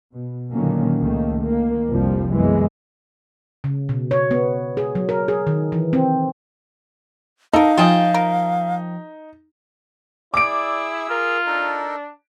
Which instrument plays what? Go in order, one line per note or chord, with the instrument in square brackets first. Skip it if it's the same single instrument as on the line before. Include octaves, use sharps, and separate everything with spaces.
[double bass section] B2
A#2 D3 D#3 F#3 A#3 C#4
C#2 D#3 A3 A#3
D#3 A#3
F1 C2 F2 F3 G3
F#2 E3 G#3 B3
[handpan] C#3
B2
C#5
B3
G#4
F#3
A#4
G#4
D#3
E3
C4
[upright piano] D#4 [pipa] A4 A#4 [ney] F5
[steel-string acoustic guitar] F3 G5 A5 [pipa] F4 G#4 D#5
[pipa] A#4
[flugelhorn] E4 [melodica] G#4 E6 [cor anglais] D5 [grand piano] D6 D7
[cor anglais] F4 [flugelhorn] A#4
[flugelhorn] D4 [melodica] D#4 A4 A#4